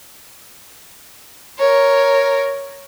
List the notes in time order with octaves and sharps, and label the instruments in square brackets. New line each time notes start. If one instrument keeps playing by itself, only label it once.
[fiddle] A#4 C#5